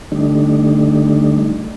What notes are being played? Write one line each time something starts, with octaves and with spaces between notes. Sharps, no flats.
D3 G3 A3 D4 D#4